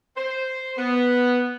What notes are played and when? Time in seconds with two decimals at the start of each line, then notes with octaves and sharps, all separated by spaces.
0.17 C5
0.78 B3